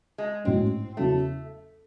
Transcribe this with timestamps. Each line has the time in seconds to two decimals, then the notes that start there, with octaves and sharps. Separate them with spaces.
0.18 G#3
0.44 A1 G#2 F#3 C4 C#4
0.97 E2 C#3 F#3 A3 C#4